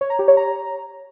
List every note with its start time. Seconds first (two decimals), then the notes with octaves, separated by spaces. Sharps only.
0.01 C#5
0.10 A#5
0.19 G4
0.28 C#5
0.37 A#5